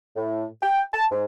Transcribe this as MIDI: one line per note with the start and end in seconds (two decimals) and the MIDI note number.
0.16 0.44 45
0.62 0.82 79
0.93 1.04 81
1.11 1.24 44